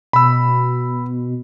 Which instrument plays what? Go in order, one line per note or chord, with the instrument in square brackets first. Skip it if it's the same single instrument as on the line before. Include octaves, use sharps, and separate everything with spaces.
[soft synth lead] B2 [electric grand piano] B5 E6